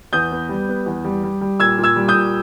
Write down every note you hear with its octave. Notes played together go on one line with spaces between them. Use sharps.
E2 D#6 G6
B3
G3
B3
E2
G3
G3
G3
A#2 E6 G#6
A#2
E6 G#6
G3
D#6 G6
A#2